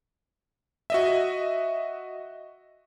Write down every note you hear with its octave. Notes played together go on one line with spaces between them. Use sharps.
F#4 D#5 E5